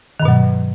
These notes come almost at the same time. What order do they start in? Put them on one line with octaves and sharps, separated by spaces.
D#3 G2 B2 F#3